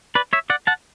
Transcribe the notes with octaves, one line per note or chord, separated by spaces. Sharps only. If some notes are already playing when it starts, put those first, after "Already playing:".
B4 D5
C#5 E5
D5 F#5
F#5 A5